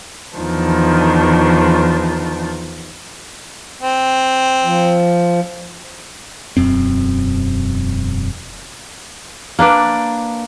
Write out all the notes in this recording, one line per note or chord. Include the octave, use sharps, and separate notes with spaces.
E2 D#3 F3 D4
C4
F3
E1 F#2 C4
A#3 D4 B4 D5